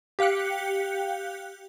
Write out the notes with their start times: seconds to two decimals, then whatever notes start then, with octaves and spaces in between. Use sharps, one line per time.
0.19 G4 F5 G5 F#6 C#7